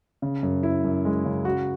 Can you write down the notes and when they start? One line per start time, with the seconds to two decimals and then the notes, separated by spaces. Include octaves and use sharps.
0.22 C#3
0.43 F#2
0.63 E4
0.84 F#2
1.05 G#3
1.25 C#3
1.45 F#4